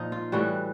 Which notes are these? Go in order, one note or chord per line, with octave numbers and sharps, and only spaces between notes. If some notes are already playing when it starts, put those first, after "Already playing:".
Already playing: A#2 F3 D#4
F4
A2 E3 G3 F#4